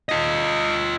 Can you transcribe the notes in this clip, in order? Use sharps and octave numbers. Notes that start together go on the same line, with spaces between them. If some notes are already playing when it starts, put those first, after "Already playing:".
F4 D#5